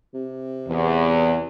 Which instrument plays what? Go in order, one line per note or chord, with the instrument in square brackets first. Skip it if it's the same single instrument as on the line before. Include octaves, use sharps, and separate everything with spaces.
[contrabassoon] C3
[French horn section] E2